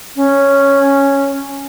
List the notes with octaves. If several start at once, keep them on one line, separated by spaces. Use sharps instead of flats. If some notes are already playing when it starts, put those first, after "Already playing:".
C#4